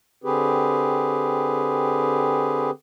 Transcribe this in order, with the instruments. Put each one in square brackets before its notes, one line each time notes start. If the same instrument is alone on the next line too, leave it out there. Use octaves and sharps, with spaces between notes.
[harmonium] D3 C4 G4 G#4 B4